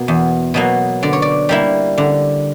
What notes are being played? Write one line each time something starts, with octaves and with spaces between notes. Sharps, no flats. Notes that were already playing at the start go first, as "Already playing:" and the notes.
Already playing: B2 A#3
E2
B2 F#3 A#3
D3 D5
C#5
D5
G3 A#3 E4
D3